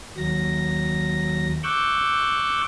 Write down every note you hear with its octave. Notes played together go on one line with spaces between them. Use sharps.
D#2 F#3 A#6
C#6 D6 E6 F#6 G6